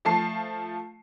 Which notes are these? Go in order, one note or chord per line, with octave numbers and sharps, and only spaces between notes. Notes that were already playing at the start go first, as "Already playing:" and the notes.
F3 A3 A5 C7